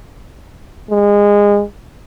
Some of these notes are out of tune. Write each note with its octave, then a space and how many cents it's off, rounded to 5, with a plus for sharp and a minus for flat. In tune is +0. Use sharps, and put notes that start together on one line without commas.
G#3 -25